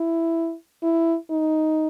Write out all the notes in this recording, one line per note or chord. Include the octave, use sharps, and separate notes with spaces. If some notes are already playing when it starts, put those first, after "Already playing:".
Already playing: E4
E4
D#4